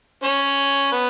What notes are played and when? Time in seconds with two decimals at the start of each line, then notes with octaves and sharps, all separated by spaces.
0.23 C#4 C#5
0.92 B3 B4